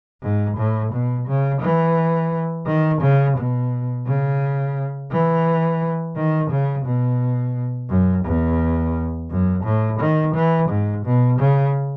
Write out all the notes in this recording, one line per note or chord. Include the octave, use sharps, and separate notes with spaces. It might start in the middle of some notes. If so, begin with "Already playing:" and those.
G#2
A2
B2
C#3
E3
D#3
C#3
B2
C#3
E3
D#3
C#3
B2
F#2
E2
F#2
A2
D#3
E3
G#2
B2
C#3